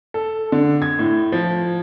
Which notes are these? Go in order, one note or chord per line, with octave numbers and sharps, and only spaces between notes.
A4
D3
G#6
A2
F3